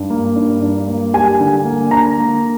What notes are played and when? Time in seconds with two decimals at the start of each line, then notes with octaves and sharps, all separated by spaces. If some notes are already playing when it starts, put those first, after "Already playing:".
Already playing: G2
0.10 A#3
0.36 G2
0.63 G2
0.87 A#3
1.13 G3 G#5
1.40 D3
1.65 A#3
1.91 D3 A#5
2.18 A#3